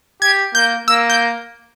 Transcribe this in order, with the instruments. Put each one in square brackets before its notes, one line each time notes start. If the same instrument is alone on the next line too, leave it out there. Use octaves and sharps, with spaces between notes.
[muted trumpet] G4 [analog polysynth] G#6
[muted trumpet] A#3 [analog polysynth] G6
[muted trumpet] A#3 [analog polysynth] E6
[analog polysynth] G6